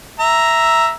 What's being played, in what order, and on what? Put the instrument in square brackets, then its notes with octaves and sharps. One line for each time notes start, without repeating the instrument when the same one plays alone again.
[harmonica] E5 A#5